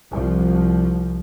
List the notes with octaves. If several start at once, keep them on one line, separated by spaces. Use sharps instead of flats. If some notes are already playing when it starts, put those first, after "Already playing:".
C2 F3